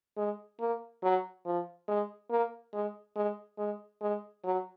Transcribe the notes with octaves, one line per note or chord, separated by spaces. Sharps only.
G#3
A#3
F#3
F3
G#3
A#3
G#3
G#3
G#3
G#3
F#3